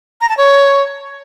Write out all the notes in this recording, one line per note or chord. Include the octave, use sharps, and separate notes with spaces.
A#5
A5
C#5